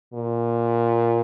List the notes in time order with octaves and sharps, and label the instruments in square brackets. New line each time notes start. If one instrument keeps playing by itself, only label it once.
[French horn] A#2